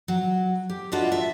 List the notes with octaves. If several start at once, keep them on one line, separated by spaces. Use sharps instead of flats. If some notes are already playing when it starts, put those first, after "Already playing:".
F#3
G4
D4 F4 F#4 B4 D#5 E5
E5